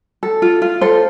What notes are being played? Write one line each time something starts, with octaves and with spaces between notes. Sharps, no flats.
A4
F4
F4
A4 C5